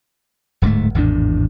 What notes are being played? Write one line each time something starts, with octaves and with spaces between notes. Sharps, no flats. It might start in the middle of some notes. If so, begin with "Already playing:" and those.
D1 G#2 G#3 A3
G#1 E2 A2 D4